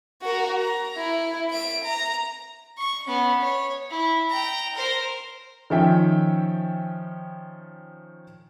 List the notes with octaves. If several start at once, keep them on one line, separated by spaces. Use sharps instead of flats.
F#4 A#4
A#5
E4
E5 D7
A#5
C#6
B3 C#4
C#5
E4
G5 A#5
A#4 C5
D#3 F3 C#4 E5 G5